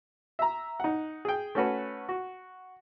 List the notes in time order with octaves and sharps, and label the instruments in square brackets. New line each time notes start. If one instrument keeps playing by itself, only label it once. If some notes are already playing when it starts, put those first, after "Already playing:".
[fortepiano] E5 A#5
D#4 F#5
G#4 G5
A3 C#4 F#4 B4
F#4